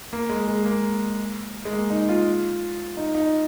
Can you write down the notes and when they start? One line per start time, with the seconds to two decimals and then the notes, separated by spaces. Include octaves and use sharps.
0.13 A#3
0.30 G#3
0.48 G#3
0.65 A#3
1.65 G#3
1.73 A#3
1.90 D#4
2.09 F4
2.97 D#4
3.15 D#4